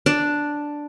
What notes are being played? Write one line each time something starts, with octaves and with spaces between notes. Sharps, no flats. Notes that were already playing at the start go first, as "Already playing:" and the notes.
D4